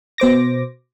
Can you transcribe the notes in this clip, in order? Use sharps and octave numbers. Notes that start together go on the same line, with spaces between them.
B2 C5 D6 A#6